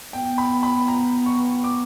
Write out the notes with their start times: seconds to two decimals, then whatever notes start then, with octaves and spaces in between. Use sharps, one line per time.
0.13 B3 G5
0.38 B5
0.63 B5
0.88 A#5
1.26 C#6
1.64 D6